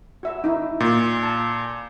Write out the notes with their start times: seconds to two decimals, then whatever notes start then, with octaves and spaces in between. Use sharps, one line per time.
0.23 F#4 E5
0.44 D#4 E4
0.80 A#2
1.23 A5